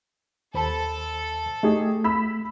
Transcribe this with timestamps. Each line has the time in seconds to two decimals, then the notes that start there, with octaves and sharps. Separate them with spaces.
0.54 D#2 A4 C5 B5
1.63 A3 D#4 G4 G#4
2.04 B5 E6 B6